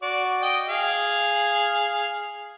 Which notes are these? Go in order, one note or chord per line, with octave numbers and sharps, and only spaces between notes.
F#4 D5
D#5 G5
G#4 F5